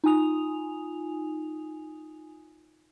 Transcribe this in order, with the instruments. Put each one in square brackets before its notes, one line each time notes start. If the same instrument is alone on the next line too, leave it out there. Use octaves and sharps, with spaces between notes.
[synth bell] D#4 F4 G#5 D#6 F7